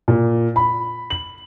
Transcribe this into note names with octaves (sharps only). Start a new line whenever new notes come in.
A#2
B5
F#7